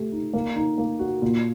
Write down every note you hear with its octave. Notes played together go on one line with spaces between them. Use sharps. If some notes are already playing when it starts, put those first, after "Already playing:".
Already playing: A3 G4
D#4
A#3
D#4
A#3
F#4
A#2